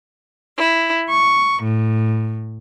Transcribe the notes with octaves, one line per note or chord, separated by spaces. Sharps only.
E4
C#6
A2